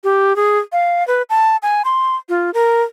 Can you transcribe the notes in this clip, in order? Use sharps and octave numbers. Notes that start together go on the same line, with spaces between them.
G4
G#4
F5
B4
A5
G#5
C6
F4
A#4